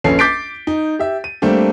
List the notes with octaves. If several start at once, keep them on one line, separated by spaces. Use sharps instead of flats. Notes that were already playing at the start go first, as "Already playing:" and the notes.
A#1 C#4 A4 B4 C7
D6 G6 A6 B6 C7 D7
D#4
G4 E5
D#7
G3 A3 A#3 C4 D4